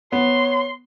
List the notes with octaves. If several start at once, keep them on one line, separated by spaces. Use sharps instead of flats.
B3 C#5 C6